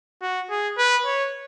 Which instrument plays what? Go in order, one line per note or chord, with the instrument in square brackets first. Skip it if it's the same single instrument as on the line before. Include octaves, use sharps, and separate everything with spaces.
[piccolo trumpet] F#4
G#4
B4
C#5